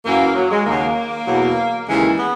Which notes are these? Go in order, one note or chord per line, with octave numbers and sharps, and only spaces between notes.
F#2 E3 A#3
F#3
G#3
D#2 C#3 F#3 A#3
E2 B2 F#3
D#2 C#3 E3 G#3
B3